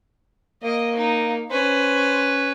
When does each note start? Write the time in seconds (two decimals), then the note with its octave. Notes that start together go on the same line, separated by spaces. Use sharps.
0.63 A#3 D#5
0.95 D#4
1.51 C#4 B4 C5